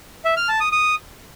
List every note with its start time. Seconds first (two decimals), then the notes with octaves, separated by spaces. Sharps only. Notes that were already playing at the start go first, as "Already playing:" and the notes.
0.25 E5
0.37 F6
0.48 A5
0.60 D#6
0.72 D#6